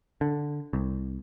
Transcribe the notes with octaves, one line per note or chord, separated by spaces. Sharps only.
D3
C2